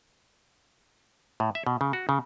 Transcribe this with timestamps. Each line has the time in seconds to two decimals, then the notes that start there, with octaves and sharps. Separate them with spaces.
1.40 A2
1.55 E5
1.67 B2
1.81 C#3
1.93 F#4
2.09 C#3